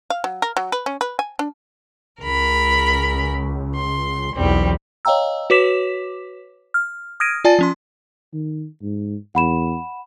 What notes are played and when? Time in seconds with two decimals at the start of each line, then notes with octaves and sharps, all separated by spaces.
0.10 F5
0.24 F#3
0.42 A#4
0.57 F#3
0.72 B4
0.86 C#4
1.01 B4
1.19 G#5
1.39 D4
2.21 C#2 A#4 B5
3.76 C6
4.36 B1 E2 G3 C4
5.05 C#5 D#5 F5 G5 A#5 E6
5.50 F#4 B4 C#5 D6 B6 E7
6.74 F6
7.20 D#6 F6 G#6 A#6 D7 D#7
7.45 F4 D5 G#5 A5 A6
7.59 F3 C#4 C6
8.34 D#3
8.82 G#2
9.35 E2 F#5 B5 E7